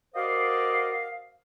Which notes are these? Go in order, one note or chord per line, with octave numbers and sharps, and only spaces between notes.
F#4 A#4 C5 D5 D#5 F5